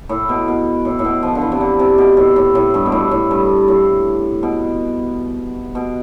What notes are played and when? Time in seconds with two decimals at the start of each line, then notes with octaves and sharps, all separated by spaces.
0.09 A2
0.29 B2
0.48 B2
0.85 A2
0.99 A2
1.04 B2
1.23 F3
1.35 D3
1.41 E3
1.52 C3
1.61 D3
1.79 C3
1.98 B2
2.17 A2
2.36 A2
2.55 A2
2.74 G2
2.86 B2
2.92 A2
3.11 A2
3.31 G2
3.68 A2
4.43 B2
5.75 B2